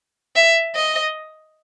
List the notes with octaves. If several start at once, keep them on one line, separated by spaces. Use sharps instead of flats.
E5
D#5